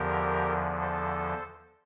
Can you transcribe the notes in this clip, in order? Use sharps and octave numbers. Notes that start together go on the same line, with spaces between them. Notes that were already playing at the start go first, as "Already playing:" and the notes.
Already playing: E2 D3 F3 G4 A#4
A4 C5